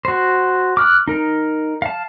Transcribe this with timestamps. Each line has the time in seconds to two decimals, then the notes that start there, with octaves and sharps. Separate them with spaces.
0.05 F#4 C5
0.77 D6 F6 F#6
1.08 D#4 A#4
1.82 F5 A5